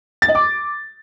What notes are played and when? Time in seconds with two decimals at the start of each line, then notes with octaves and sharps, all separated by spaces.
0.22 A6
0.28 D#5
0.35 D6